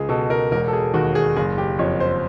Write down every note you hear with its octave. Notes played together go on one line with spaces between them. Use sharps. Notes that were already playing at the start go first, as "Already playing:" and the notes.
Already playing: C#2 G#4
B2 A4
A#4
E1 A#4
A4
G#4
D#2 F#4
G#4
F#1 G#4
G4
F2 C#5
C5